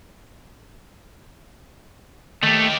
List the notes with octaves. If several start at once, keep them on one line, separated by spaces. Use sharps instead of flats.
D#3 A3 G4